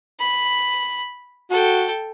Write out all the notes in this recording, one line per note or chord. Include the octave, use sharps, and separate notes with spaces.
B5
F#4 A4 G5